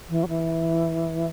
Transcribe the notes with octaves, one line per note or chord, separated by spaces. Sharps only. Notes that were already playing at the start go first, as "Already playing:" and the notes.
E3
F#3
E3